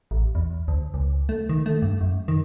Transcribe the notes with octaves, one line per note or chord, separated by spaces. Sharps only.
A1
E2
D2
C#2
A3
D#3
A3
G2
F#2
D#3